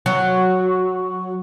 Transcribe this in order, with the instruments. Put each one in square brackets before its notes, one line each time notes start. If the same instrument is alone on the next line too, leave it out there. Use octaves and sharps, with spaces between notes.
[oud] F#3